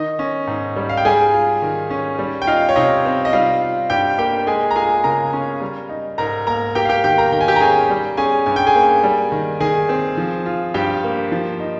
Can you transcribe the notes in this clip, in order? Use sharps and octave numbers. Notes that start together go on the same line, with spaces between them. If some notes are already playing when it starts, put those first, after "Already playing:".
Already playing: D#3 D#4 D#5
C#4
G#2
G3
F5
G5
G3 G#4 G#5
F4
D#3
C#4
G3
G5
D#4 F4 F5
C#5
C3 D#4 D#5
C4
D#5
G3 F4 F5
F4
G2 G4 G5
A#3 G4 G5
G#3 G#4 G#5
A#5
F4 G#4 G#5
C#3 A#4 A#5
C#4
G3
D#4
G#2 A#4 A#5
A#3 A#4 A#5
A#3 G4 G5
F5
G4 G5
D#3 G4 G5
A#4 A#5
D#3 G5
G#5
G4 G5
A#5
C#4 G#4 G#5
G3
C#4 G#4 G#5
G2 G#5
G5
G#4 G#5
A#3
G3
D#3
D#3 G#4 G#5
C4
F3
F4
G2 G4 G5
A#3
F3
D#4